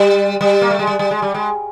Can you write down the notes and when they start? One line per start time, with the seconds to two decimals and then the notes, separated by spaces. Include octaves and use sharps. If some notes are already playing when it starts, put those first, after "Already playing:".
Already playing: G3
0.41 G3
0.62 A#3
0.70 A3
0.79 G#3
0.87 G3
0.99 G3
1.11 G#3
1.22 G3
1.34 G#3